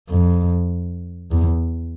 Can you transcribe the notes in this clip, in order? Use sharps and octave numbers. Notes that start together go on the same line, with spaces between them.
F2
E2